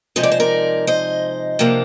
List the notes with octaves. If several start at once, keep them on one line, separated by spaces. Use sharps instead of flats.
C3 F3 G#3 D#4 D#5
D5
C5
A#4 D5
C5 D#5
C3 F3 A#3 D4